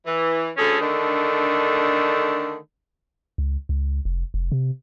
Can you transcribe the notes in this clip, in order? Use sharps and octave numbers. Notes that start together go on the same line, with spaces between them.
E3
D2 C#4 G#4 A4
D3 D#3 A3 D4
C#2
C#2
F1
F1
C3